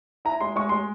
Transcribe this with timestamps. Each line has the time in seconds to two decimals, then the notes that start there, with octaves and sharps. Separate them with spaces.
0.25 E4 A#5
0.41 G#3 C6
0.56 G#3 C#6
0.69 G#3 C6